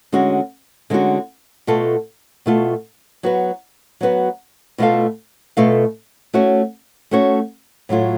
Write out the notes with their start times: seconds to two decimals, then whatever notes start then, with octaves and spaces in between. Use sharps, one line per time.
0.12 D3 G#3 C#4 F#4
0.90 D3 G#3 C#4 F#4
1.67 B2 A3 F4 A4
2.46 B2 A3 F4 A4
3.23 F#3 B3 F#4 B4
4.01 F#3 B3 F#4 B4
4.78 B2 A3 F4 A4 F5
5.57 B2 A3 F4 A4 F5
6.33 A3 C#4 F#4 C#5
7.11 A3 C#4 F#4 C#5
7.89 A2 F#3 A3 F4